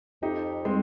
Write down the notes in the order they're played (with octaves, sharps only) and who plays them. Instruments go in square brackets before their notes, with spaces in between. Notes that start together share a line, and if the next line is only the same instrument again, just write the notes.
[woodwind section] F2 [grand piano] D#4 G4
[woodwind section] G3 [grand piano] G#3 C4